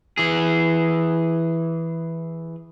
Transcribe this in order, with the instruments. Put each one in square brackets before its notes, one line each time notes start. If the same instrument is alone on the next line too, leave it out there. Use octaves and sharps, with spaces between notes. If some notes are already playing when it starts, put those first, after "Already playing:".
[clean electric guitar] E3 G#4